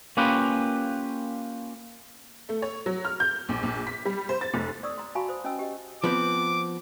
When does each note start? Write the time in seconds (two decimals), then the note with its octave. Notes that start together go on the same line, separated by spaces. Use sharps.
0.17 A#3 C#4 F4 G4 B4
2.49 A3
2.62 C#5
2.86 F#3
3.05 F6
3.20 G6
3.49 A#1
3.63 A#1
3.87 B6
4.05 G3
4.29 C5
4.41 A6
4.54 F1
4.83 D5 C#6 D#6 E6
4.98 A#5 C6
5.15 F#4 F5 G#5 A5 B5 C#6
5.29 C5 D#6
5.44 C#4 D#5 G#5 E6
5.59 G4 D#5
6.04 F3 B3 C4 D6